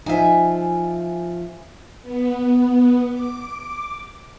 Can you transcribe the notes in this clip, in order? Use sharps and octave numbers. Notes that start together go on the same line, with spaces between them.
F3 D#4 E5 G#5
B3
D6